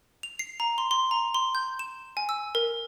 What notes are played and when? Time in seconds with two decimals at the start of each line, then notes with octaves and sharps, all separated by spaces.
0.23 F7
0.39 C7
0.60 A#5
0.78 C6
0.91 C6
1.11 A#5
1.34 C6
1.55 G6
1.79 E7
2.17 G#5
2.29 E6
2.55 A#4